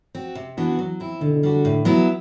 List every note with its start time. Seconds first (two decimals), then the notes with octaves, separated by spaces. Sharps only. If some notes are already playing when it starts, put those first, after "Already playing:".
0.15 C4 F#4
0.35 C3
0.57 E3 B3 D4 F#4
0.79 F#3
1.00 C4 E4
1.21 B2 D3
1.43 G3 D4 F#4
1.65 A2
1.85 F#3 B3 E4